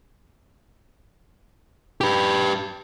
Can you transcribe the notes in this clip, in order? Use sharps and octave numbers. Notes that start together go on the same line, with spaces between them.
G4 B4